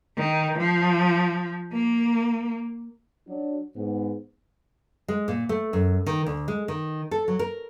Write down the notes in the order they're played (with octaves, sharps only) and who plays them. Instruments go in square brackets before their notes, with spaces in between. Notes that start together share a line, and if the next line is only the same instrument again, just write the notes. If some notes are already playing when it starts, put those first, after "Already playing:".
[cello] D#3
F3
A#3
[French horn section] F#3 D4
G#2 B3
[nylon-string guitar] G#3
A#2
A3
F#2
D#3
D2
G#3
D#3
A4
F#3
A#4